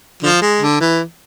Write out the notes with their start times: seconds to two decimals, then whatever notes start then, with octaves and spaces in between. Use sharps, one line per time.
0.23 D3 F3
0.42 G#3
0.60 D3
0.80 E3